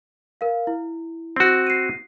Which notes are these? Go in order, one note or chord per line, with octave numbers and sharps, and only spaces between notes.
A#4 F5
E4
C4 F#4
C7 D#7